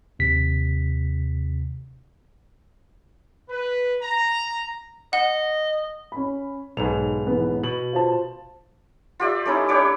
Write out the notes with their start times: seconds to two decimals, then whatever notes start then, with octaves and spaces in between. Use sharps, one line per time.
0.19 D#2 C3 B6
3.50 B4
4.03 A#5
5.13 D#5 F#5
6.12 C#4 B5
6.77 B1 G#2 F7
7.27 E3 B3
7.63 B2 F#7
7.93 F4 C5 A5
9.20 F4 G4 D5 E5
9.45 A3 C#4 D#4 E4
9.69 D4 G4 C#5 D6